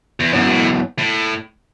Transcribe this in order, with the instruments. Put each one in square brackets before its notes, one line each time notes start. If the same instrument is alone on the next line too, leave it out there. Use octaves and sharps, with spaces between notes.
[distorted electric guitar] E2
[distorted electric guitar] F#2 [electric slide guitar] F#3 B3 E4 C#5
[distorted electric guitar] A2
A2